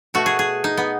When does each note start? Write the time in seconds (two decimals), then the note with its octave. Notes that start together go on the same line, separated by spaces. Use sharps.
0.14 B2 A3 F#4
0.26 G#4
0.39 G#4
0.64 D#4
0.77 B3